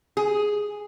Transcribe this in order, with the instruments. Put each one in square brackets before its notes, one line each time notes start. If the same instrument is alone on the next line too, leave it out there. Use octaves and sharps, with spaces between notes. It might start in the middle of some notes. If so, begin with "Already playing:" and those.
[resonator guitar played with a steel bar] G#4